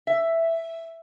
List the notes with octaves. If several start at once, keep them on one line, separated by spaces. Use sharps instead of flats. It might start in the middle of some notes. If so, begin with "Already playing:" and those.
E5